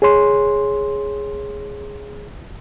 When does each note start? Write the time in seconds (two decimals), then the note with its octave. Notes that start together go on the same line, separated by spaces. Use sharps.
0.02 G#4 C#5 C6